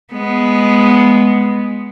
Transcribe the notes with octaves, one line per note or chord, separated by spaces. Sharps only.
G#3 B3